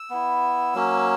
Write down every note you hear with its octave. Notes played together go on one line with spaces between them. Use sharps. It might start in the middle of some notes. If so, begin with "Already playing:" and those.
Already playing: E6
B3 E4
F#3 A#3 C#4